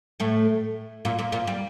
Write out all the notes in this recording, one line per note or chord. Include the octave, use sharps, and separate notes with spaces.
A2 A3
A#2 A#3
A#2 A#3
A#2 A#3
G3